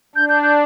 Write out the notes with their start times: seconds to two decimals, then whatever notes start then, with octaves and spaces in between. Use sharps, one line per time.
0.16 D4 G6
0.29 G6
0.43 G6